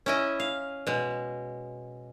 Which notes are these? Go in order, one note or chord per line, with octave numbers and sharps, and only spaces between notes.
C#4 E4 D#5
F5
B2 G#3